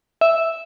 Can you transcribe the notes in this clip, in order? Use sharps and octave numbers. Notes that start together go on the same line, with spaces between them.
E5